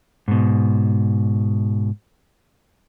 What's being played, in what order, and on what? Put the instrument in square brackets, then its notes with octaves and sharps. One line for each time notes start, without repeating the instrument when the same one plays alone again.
[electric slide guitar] G#2 B2